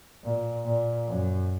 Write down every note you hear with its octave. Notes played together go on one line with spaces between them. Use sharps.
A#2
A#2
F#2